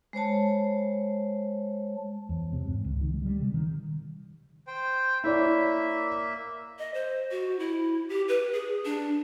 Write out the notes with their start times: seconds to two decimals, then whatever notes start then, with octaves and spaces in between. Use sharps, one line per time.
0.13 G#3 C5 C#5 A5
2.29 E2
2.52 C3
2.65 G#2
2.85 C#2
3.01 D#3
3.14 G#3
3.26 G3
3.41 C3
3.54 D#3
4.67 C5 G5
5.24 A#3 E4 C#5 D5 E5
6.79 D#5
6.94 C5
7.31 F#4
7.59 E4
8.09 G4
8.28 B4
8.53 G#4
8.85 D4